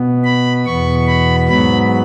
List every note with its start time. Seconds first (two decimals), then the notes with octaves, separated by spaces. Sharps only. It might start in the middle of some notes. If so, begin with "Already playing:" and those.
Already playing: B2 B3
0.24 B5
0.66 E2 B2 B3 C#6
1.07 B5
1.49 G#2 F#3 B3 B5